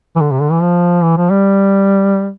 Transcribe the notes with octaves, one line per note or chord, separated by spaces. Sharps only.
E3
D3
C3
D3
E3
F3
E3
F3
G3